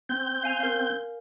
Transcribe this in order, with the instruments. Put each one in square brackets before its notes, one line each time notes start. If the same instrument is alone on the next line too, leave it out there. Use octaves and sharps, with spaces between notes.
[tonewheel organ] C4 G6
[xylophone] F5 G#5 F7
A#4 F5